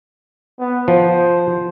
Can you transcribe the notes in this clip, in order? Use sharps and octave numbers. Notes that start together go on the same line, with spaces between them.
B3
F3 C5